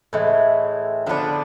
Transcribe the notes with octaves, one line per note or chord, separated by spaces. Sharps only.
A2 E3 G#3
D3 F3 B3 D4